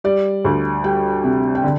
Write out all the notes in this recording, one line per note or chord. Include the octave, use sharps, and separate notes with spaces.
G3 D5
D2
G3 G5
C3
G5
D3